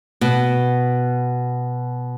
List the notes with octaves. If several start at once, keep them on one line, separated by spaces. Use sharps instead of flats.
B2